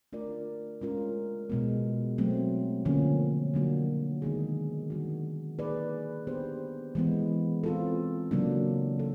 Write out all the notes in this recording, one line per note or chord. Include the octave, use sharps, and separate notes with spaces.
A3 D4 F4 A#4 D5
G#3 C#4 F4 A#4
B2 G#3 B3
F#3 A3 C4
D3 F3 A#3 C#4
D3 F#3 A#3 D4 F#4
D#3 G#3 B3 D#4 G#4
D#3 G3 A#3 D4 F#4
A#3 D#4 G#4 B4 D5
B3 D4 G4 C5
E3 G#3 B3
C4 F4 A4
C#3 F#3 A#3 D4
A4